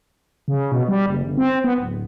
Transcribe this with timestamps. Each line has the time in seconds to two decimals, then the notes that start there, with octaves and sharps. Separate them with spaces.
0.48 C#3
0.72 B2
0.88 G3
1.06 F#1
1.23 G1
1.37 C4
1.64 B3
1.78 D1